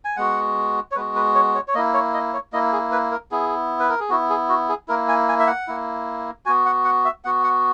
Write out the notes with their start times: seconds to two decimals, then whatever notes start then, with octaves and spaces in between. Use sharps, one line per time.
0.05 G#5
0.17 G#3 B3 F#4 F#5
0.91 C#5
0.95 G#3 B3 F#4 B4
1.16 B4
1.35 C#5
1.55 C#5
1.68 C#5
1.75 A#3 E4 D#5
1.94 C#5
2.14 D#5
2.34 C#5
2.53 A#3 E4 D#5
2.73 G#4
2.92 B4
3.11 A#4
3.31 B3 E4 G#4
3.80 B4
3.90 A#4
4.00 G#4
4.09 B3 E4 F#4
4.30 G#4
4.49 F#4
4.69 G#4
4.88 A#3 E4 A#4
5.08 G#5
5.29 G#5
5.39 E5
5.47 F#5
5.67 A#3 E4
6.46 B3 F#4 G#5
6.66 F#5
6.85 F#5
7.05 E5
7.24 B3 F#4 F#5
7.43 F#5